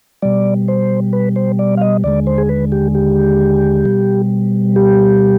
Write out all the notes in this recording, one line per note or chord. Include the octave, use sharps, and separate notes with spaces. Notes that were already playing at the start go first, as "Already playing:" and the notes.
B2 G3 D5
C5
B4
C5
D5
F5
D#5
D#2 D3 G#3 D5
C5
G#4
B4
G4
G4
B2 G3
G4